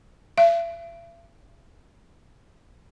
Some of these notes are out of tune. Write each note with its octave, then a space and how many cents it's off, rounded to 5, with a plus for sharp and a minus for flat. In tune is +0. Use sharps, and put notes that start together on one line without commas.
E5 +40